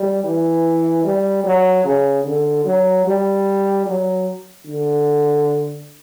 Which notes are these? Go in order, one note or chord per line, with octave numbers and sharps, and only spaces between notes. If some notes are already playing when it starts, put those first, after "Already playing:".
Already playing: G3
E3
G3
F#3
C#3
D3
F#3
G3
F#3
D3